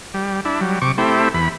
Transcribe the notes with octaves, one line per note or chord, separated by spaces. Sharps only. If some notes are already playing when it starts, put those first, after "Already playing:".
G3
D4 E4
F#3 G3
C3 C#6 D6
A3 C4 E4 G4
E2 B5